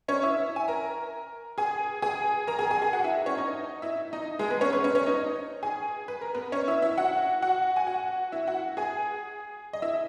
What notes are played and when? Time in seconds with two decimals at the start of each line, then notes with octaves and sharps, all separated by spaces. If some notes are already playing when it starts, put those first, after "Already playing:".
0.08 C#4 C#5
0.23 E4 E5
0.56 G#5
0.68 A#4 A#5
1.58 G#4 G#5
2.02 G#4 G#5
2.47 A#4 A#5
2.59 G#4 G#5
2.71 G#4 G#5
2.82 G#4 G#5
2.93 F#4 F#5
3.04 E4 E5
3.26 C#4 C#5
3.37 D#4 D#5
3.82 E4 E5
4.13 D#4 D#5
4.39 G#3 G#4
4.50 B3 B4
4.61 C#4 C#5
4.73 B3 B4
4.84 C#4 C#5
4.95 C#4 C#5
5.06 D#4 D#5
5.63 G#4 G#5
6.08 B4
6.21 A#4
6.35 B3 B4
6.52 C#4 C#5
6.68 E4 E5
6.82 E4 E5
6.98 F#4 F#5
7.42 F#4 F#5
7.76 G#5
7.87 F#4 F#5
8.32 E4 E5
8.47 F#4 F#5
8.77 G#4 G#5
9.73 D#5
9.82 E4 E5